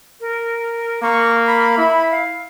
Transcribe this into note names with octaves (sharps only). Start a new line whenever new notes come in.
A#4
A#3 C#6
B5
E4
F5